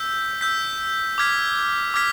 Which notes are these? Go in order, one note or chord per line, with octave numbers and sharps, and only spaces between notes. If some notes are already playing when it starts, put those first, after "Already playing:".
Already playing: E6 G6 B6
E6 G6 B6
D6 F6 G#6 B6
D6 F6 G#6 B6